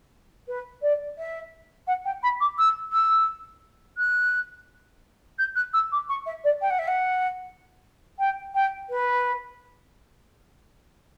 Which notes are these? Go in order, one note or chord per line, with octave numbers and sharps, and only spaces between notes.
B4
D5
E5
F#5
G5
B5
D6
E6
E6
F#6
G6
F#6
E6
D6
C#6
E5
D5
G5
F#5
E5
F#5
G5
G5
B4